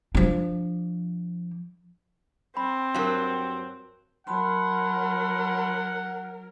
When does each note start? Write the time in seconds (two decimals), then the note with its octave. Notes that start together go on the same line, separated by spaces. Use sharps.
0.15 F3 D4
2.57 C4 B5
2.94 G2 F#3 A#4 F5
4.27 F#3 A#4 F#5 A5 B5 C6